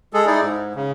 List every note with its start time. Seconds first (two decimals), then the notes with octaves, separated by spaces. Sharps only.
0.14 G#3 G#4 A4
0.26 D#4 E4 G#4 D5
0.41 G#2
0.76 C#3